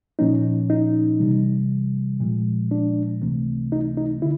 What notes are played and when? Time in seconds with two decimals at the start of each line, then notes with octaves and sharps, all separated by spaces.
0.19 A#2 F3 A#3 C#4 D#4
0.70 D#4
1.20 C3 E3 G3
2.20 A#2 F3 G#3
2.71 D4
3.22 C#2 C3 E3 A3 C4
3.72 D#4
3.97 D#4
4.22 D3 E4